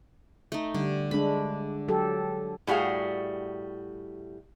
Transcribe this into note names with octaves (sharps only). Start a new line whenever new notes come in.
A3 D#4
D3 G3
G#3 D4 B5
F#3 G4 A4
A2 G3 F#4 G#4 F5